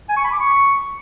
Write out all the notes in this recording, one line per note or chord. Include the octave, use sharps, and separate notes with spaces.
G#5
C#6
B5
D6
C#6